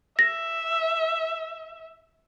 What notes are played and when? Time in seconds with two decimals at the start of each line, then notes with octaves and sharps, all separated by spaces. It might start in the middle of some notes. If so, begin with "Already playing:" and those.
0.19 E5 A#6